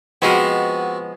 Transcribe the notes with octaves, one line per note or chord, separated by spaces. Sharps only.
F3 G#3 B3 C4 F#4 D#5